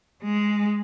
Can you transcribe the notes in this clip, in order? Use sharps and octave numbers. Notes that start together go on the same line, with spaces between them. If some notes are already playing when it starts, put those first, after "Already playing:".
G#3